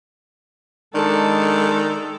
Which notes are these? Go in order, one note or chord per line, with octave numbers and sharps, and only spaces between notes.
D#3 G#3 D4 A4